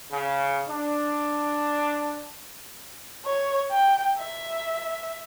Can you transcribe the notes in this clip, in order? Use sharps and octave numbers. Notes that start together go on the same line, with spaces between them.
C#3
D4
C#5
G5
E5